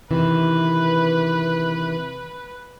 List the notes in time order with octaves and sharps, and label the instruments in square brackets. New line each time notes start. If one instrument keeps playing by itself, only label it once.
[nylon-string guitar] C3 D#3 E3 [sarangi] B4